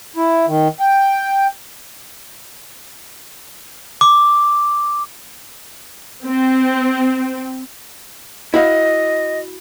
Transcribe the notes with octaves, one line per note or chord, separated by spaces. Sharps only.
E4
D#3
G5
D6
C4
E4 F#4 D#5 F5